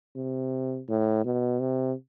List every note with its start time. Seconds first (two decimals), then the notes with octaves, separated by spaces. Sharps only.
0.16 C3
0.89 A2
1.25 B2
1.60 C3